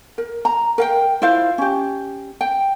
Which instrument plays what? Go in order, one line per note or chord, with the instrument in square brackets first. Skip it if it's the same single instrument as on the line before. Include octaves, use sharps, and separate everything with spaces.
[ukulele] A#4
A#5
A#4 F5 G5
E4 F4 C5 F5
C#4 G4
G5